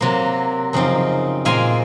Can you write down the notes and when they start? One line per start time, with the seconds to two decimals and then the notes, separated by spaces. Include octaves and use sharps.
0.01 C3 F#3 A#3
0.73 F#2 C#3 F3 C4 D#4
1.45 A#2 G#3 C4 F5 G#5